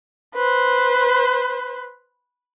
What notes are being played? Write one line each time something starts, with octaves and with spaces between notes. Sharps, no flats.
B4 C5